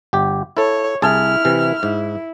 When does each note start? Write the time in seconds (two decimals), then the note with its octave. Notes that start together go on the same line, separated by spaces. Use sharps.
0.13 G1 G4
0.57 E4 A4 C#5
1.02 C2 E4 G#4 A5 F6
1.45 C3 E3
1.83 G#2 E4